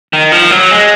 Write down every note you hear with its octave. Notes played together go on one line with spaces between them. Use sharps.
D#3
F3
F#3
G#3